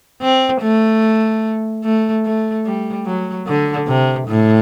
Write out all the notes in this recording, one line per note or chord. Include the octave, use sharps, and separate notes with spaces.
C4
A3
A3
A3
G3
F#3
D3
C3
A2